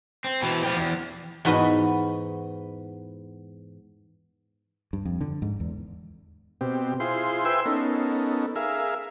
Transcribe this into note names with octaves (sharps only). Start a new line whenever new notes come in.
C4
B2 E3
F3 G4
E2
E2 G#2 F#4 B4 D#5
G2
F2
D3
G#2
E2
B2 C4 G4
E4 F4 G#4 C5 C6
B4 E5 G5 G#5 C6 E6
B3 C#4 D#4 A4 A#4
G#4 A#4 E5 F5